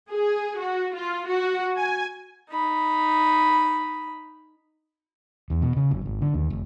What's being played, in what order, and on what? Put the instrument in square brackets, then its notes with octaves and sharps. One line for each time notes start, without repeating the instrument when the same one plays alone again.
[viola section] G#4
F#4
F4
F#4
G#5
[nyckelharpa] D#4 B5
[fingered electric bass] E2
B2
C#3
F#1
G#1
D3
D#2
F1